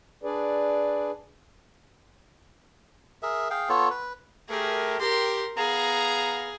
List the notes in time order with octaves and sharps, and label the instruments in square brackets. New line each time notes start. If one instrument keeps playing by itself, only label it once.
[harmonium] D4 G#4 B4 D5
[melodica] G#4 A#4 E5
G#4 F5 G5
B3 F4 A4 C#5
B4
[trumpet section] A3 G4 A#4 [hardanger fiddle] G#4
[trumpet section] G4 [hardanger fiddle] A#4 C6
[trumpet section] B3 F5 A#5 [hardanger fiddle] G#4